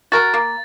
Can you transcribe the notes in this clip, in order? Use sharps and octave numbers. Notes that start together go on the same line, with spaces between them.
F#4 A#4 A6
A#3